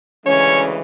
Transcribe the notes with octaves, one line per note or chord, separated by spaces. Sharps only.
D2 C#3 E3 G#3 C#4 C#5